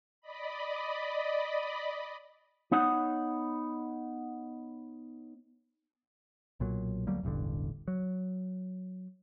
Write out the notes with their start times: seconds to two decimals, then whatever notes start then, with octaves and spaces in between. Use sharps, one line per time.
0.21 D5 D#5 B5
2.72 B3 D#4 C#5 F#5
6.60 B1 A#2 F#3
7.07 D2 F#3 G3 A#3
7.23 E1 A1 G2 D3
7.88 F#3